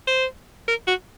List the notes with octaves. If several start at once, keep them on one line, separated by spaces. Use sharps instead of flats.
C5
A#4
F#4